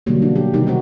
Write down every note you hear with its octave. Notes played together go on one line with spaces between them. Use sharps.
B2 D3 E3 F#3 G3 A#3
D4
G4
C3 D#3 G3 D#4 G4
G3 C4 F#4